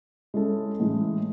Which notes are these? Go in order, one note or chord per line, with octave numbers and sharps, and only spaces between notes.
G#3 C#4 E4 A4
A2 E3 G#3